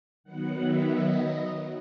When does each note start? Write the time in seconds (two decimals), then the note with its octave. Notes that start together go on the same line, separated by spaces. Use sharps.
0.24 D#3 F#3 B3 F#5
0.60 E5
0.96 D#5